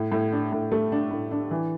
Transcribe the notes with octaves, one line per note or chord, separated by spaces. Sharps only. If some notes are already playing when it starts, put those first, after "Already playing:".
Already playing: A2
A2
D4
A2
A3
D4
A2
D4
E3